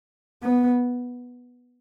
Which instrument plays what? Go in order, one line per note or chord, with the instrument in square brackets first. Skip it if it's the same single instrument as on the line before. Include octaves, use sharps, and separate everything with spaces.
[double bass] B3